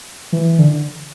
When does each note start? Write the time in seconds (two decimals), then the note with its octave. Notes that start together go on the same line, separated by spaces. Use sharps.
0.32 E3
0.59 D3